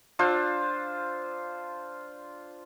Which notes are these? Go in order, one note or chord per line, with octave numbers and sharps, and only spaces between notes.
D4 F4 C5 E6